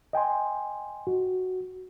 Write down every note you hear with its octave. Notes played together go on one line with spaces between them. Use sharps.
D#5 G5 G#5 C6
F#4